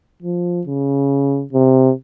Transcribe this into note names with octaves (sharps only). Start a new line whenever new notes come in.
F3
C#3
C3